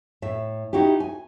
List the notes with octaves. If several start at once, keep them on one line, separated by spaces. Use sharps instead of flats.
A2 E5
D#4 E4 F#4 G4
G#5